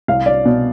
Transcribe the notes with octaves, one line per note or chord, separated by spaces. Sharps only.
C2 F5
D5
B2